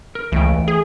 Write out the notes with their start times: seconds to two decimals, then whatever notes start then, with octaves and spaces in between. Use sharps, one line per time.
0.15 A#4
0.32 C#2 E3 A3 G5
0.68 G#4